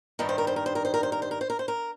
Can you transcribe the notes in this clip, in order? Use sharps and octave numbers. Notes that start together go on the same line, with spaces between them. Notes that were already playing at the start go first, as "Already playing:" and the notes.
G2 D#3 G3 A#4
C5
A#4
C5
A#4
C5
A#4
C5
A#4
C5
A#4
C5
A#4
C5
A#4
C5
A#4